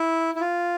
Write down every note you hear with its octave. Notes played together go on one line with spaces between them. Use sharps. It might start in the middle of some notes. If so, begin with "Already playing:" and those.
Already playing: E4
E4
F4